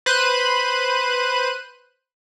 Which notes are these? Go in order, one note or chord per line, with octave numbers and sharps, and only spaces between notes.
B4 C5 F#6 D#7